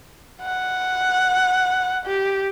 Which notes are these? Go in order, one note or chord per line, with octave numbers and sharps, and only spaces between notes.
F#5
G4